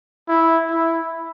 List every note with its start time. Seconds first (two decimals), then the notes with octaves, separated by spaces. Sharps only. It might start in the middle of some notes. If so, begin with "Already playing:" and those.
0.28 E4
0.70 E4